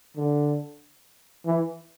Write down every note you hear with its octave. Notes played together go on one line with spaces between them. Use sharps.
D3
E3